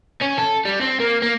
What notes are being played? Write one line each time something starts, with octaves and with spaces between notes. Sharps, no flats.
C#4
A4
G3
C4
A#3
A#3